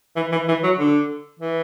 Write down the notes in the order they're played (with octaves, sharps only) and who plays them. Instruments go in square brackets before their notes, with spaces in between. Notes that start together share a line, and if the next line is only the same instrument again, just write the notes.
[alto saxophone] E3
E3
E3
F#3
D3
E3